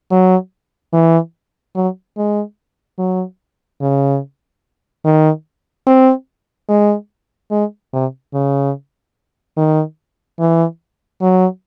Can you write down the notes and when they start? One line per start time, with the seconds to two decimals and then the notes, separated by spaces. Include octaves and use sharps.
0.11 F#3
0.93 E3
1.75 F#3
2.17 G#3
2.99 F#3
3.81 C#3
5.05 D#3
5.87 C4
6.69 G#3
7.51 G#3
7.93 C3
8.34 C#3
9.57 D#3
10.39 E3
11.21 F#3